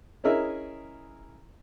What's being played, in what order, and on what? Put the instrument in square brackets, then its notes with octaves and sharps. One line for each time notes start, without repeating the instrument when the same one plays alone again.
[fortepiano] C#4 E4 G#4 A#4 D#5 E5